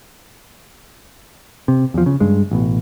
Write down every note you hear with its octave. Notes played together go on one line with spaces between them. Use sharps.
C3
E2 F3
C#3
G2 G#3
A1 B2